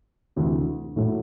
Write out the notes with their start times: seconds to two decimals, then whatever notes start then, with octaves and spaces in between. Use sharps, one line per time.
0.36 D2 C3 E3
0.96 A2 F#3 A3